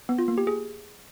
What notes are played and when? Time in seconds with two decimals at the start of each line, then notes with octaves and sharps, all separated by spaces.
0.09 B3
0.19 F4
0.28 A#3
0.38 G4
0.47 G#4